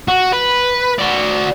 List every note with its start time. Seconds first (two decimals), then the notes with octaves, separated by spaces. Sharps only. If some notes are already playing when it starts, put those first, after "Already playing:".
0.08 F#4
0.32 B4
0.99 F#4 D5